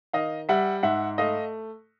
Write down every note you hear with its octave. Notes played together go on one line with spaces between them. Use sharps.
D#3 D#5 F5
G3 E5 F#5
G#2 E5 F#5
A3 D#5 F5